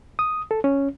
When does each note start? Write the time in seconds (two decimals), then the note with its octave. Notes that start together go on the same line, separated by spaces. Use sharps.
0.19 D#6
0.51 A4
0.64 C#4